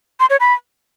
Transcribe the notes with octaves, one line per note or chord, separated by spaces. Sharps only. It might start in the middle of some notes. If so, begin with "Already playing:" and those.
C6
C#5
B5